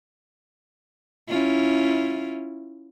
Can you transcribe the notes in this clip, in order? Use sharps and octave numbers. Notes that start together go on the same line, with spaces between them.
C#4 E4 F4